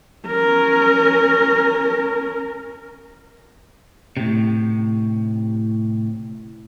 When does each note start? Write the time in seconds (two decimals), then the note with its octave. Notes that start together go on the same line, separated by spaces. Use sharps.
0.27 C#4 A#4
4.17 A2 C3